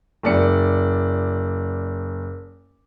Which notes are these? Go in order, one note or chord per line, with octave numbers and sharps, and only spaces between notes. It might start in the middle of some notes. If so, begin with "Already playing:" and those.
F#1 D5 C#7